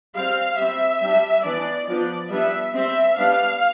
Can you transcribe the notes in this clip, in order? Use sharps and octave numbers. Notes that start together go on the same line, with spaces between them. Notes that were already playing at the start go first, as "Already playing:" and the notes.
G3 C4 F5
G3 C4 E5
G3 D4
E3 B3 D4 D5
F3 B3 D4 D5
G3 B3 D4 E5
G3 C4 E5
G3 B3 D4 F5